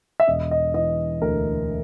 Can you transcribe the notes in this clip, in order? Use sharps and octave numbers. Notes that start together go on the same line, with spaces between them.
E5
E1 D#5
D#5
E3 D#5
D2 A#4